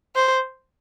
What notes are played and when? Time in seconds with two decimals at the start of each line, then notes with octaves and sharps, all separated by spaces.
0.15 C5